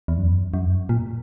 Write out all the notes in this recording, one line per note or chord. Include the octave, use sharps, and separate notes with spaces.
E2
F#2
F#2
A#2